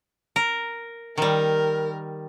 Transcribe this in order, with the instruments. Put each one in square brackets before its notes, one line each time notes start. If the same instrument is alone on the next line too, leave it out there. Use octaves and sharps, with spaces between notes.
[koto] A#4
[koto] D#3 G3 [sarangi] A#4